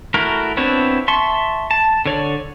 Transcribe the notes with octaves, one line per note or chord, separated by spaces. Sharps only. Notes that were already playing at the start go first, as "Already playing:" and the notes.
A3 E4 F#4 A#4
B3 C4 D4 E4 C#5
E5 A5 C6 C#6
A5
D3 C#5 D5